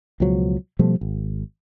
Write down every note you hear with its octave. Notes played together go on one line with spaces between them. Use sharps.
C#2 B2 F3 F#3
B2 F3 G3 A3
G#1